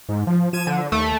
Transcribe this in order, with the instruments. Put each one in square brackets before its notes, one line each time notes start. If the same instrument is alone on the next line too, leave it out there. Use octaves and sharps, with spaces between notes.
[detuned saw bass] G#2
F3
[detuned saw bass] F3 [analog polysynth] G#6 D#7 E7
[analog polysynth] D3
[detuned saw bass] D#2 [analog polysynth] A3